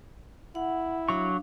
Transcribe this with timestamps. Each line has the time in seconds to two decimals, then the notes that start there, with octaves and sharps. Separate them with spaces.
0.55 E4 F#5
1.09 F#3 D4 F5 C#6